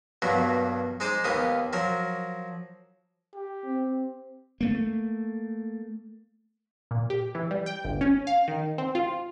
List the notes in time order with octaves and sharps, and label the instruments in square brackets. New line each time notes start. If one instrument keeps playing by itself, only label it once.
[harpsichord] G2 B2 F#3 A#3
G#3 D#4 C5 A#5 D6 D#6
D#2 A#3 B3 F5 D#6
F3 F#3 A#4
[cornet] G4
[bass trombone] C4
[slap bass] A3 A#3
[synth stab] A#2
G4
E3
G3
G5
G1
C#4
F5
D#3
C4
F4